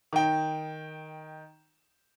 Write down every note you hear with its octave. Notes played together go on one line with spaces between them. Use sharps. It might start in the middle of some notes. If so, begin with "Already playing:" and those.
D#3 G5